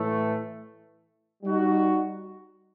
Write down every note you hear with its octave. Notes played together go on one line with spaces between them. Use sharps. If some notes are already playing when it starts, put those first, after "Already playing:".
Already playing: A2 E3 A3
G3 D#4 F#4